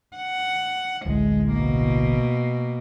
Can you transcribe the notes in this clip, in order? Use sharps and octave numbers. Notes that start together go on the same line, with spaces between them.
F#5
D1 A1 D2 G#3
B2 A#3